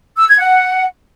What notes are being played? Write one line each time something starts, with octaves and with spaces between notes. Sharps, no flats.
E6
G#6
F#5